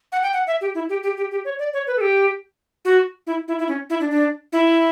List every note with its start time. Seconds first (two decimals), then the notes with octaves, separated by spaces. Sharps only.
0.12 F#5
0.23 G5
0.33 F#5
0.47 E5
0.61 G4
0.75 E4
0.89 G4
1.03 G4
1.17 G4
1.31 G4
1.45 C#5
1.59 D5
1.73 C#5
1.87 B4
1.96 A4
2.01 G4
2.85 F#4
3.27 E4
3.48 E4
3.59 E4
3.68 C#4
3.90 E4
4.00 D4
4.11 D4
4.52 E4